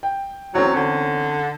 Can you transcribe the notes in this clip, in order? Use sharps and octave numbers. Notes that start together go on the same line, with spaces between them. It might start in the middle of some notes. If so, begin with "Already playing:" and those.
G5
E2 F#3 C4 C#4
D3